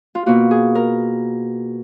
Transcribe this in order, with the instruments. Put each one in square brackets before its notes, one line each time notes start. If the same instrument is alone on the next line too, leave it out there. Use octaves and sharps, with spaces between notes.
[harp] F4
B2 A#3 F4 F#4
G#4
A#4